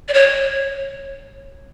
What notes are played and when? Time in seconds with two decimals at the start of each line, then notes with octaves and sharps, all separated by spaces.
0.08 D5
0.13 C#5